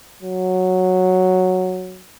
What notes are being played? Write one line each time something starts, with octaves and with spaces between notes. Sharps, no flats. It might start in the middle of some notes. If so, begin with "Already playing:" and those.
F#3